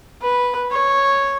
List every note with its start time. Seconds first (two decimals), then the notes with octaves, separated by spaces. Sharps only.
0.22 B4
0.71 C#5